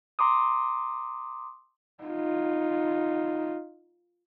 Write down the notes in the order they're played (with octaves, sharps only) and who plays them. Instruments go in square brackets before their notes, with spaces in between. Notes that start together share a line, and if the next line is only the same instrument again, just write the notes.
[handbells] A#5 C6 D6 D#6
[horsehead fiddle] D#4 F4